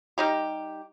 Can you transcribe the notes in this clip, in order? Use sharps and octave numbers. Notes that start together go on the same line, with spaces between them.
G3 D#4 G4